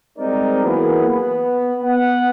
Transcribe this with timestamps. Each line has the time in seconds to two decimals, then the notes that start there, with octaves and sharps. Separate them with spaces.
0.18 G3 G#3 C4 D#4 A#4 D5
0.64 E3 F#3 A#3 B3 G#4
1.07 B3
1.83 B3 F#5